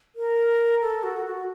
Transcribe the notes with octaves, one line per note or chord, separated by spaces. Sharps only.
A#4
A4
F#4
F#4